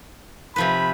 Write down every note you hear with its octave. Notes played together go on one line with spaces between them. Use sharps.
C3 F3 B4 B5